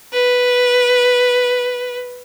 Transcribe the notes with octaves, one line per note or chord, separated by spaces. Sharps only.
B4